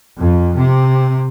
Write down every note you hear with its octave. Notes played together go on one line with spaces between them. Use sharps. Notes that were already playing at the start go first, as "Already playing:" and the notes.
F2
C3